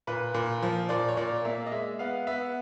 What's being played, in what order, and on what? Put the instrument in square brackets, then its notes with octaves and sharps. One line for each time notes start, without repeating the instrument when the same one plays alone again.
[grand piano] A#2 B4
A#2
F3
A#2 D5
C#5
A#2 D5
A#3 E5
D#5
G#3 E5
B3 F5
B3 E5